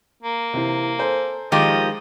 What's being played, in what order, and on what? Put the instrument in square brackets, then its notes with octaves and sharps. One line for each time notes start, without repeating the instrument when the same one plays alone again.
[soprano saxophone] A#3
[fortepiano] C3 E3
A4 C5 G#5
[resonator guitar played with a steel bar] D#3 F3 G4 [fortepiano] G#3 [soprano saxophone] D#5